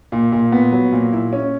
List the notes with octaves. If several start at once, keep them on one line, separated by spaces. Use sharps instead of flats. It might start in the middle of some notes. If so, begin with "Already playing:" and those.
A#2
A#2
B3
F#3
A#2
E4
C#4